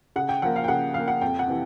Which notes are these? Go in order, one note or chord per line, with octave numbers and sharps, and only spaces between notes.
C#3 F#5
G5
F3 A#3 F#5
F5
G5
C#3 F#5
F3 A#3 F5
F#5
F2 G5
F#5
C3 E3